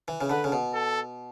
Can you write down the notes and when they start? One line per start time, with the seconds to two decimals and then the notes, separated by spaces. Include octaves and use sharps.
0.08 E3
0.21 C#3
0.30 D3 B4
0.44 C#3
0.52 B2
0.74 A4